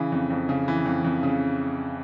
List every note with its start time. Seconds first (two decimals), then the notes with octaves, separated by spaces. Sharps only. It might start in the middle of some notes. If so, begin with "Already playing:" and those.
Already playing: C#3 E3
0.12 F2
0.30 F2
0.49 C#3
0.68 E3
0.86 F2
1.04 F2
1.23 C#3